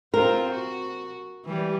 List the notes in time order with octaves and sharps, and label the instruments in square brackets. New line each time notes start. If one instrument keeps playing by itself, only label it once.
[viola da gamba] C4 F4 C5 [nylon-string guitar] A#4
[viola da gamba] F#4
E3 G3